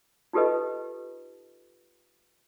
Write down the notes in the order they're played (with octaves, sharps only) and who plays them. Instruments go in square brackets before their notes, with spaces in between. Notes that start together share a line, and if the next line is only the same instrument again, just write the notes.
[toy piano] D#4 F4 G4 A4 B4 D#5